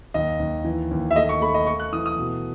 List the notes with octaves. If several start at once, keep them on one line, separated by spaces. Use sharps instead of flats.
D#2 D#5
D#2
E3
D#2
E5
A3 D#5
C#6
A3 B5
D#5
A3 C#6
F#6
E3 D#6
D#6
B2